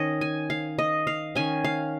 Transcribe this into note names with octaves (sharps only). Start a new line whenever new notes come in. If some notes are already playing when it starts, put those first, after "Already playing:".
Already playing: D#3 C#4 C#5 D#5
G#5
F5
D#5
F5
D#3 C#4 G#5
F5